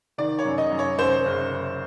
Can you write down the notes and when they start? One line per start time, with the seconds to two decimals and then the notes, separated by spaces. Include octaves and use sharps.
0.18 D#3 D5
0.39 C#5
0.45 F#2
0.58 D#5
0.71 F#2
0.79 C#5
0.98 F#2 C5
1.25 F#1
1.51 F#1